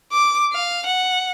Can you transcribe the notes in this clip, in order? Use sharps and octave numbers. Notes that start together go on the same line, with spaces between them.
D6
F5
F#5